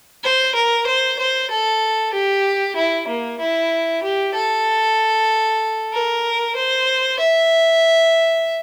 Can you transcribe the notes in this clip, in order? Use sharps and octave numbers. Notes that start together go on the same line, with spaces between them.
C5
A#4
C5
C5
A4
G4
E4
A#3
E4
G4
A4
A#4
C5
E5